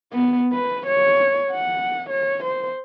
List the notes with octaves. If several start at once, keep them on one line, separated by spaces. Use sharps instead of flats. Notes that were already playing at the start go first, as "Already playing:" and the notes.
B3
B4
C#5
F#5
C#5
C5